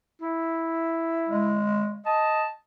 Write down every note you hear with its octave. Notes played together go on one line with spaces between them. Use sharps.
E4
G#3
D#5 A5